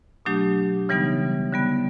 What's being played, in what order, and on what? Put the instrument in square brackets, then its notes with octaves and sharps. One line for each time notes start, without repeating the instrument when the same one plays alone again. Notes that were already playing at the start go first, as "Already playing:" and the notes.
[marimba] B2 F#3 A3 D4 G4
C#3 E3 G3 B3 D#4
D3 G3 B3